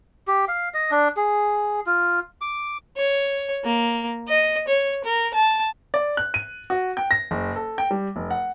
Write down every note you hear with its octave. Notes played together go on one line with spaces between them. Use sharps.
G4
F5
D#5
D4
G#4
F4
D6
C#5
A#3
D#5
C#5
A#4
A5
D5
F#6
D#7
F#4
G5
A#6
F#1
A4
G5
G3
F1
F#5